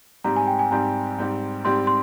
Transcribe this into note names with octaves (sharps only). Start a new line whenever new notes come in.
G#2 G3 C4 G4 A#5
G#5
G5
G#5
G#2 G3 C4 G4 A#5
G#2 G3 C4 G4
G#2 G3 C4 G4 C6
C6